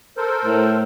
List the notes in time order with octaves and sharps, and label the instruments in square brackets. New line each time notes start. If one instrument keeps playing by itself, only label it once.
[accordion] A4 A#4 C5
[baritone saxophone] A2